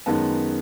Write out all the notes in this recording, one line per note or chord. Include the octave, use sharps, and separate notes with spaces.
F#2 D#3 G#3 B3 A5